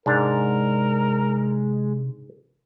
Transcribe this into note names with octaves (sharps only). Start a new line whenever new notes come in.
G#2 C3 G#3 D4 A#4